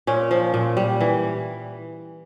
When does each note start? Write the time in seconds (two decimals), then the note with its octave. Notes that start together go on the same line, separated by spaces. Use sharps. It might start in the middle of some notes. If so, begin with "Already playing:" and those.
0.07 A#2 C#4
0.31 F3
0.54 A#2
0.77 G3
1.01 E3